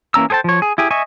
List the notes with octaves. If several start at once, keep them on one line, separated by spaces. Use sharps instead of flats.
E3 A#3 C#4 A#5 E6
G#4 A4 C5 G5 A5
F3 C#5
G#4
E4 G4 G#4
D#5 E5 G#5 C#6